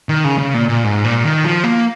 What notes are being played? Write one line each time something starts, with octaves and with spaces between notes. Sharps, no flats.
D#3
C#3
C#3
A#2
A#2
G#2
A#2
D#3
F3
A#3